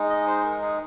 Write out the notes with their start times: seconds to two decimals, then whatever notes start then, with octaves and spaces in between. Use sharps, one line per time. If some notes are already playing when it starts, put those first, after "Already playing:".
Already playing: G#3 D#4
0.10 D#5
0.27 C5
0.45 A#4
0.62 G#4